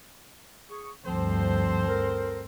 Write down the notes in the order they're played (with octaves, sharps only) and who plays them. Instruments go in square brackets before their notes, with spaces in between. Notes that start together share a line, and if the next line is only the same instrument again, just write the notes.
[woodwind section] G#4 C#6
[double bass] D2 G2 [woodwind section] F3 [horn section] C4 A4 C5
[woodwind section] A#4